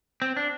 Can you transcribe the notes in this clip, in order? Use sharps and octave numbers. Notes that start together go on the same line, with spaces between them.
C4
D4